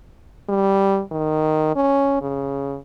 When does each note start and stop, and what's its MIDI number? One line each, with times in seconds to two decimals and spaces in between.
0.49 1.02 55
1.12 1.71 51
1.76 2.17 61
2.22 2.78 49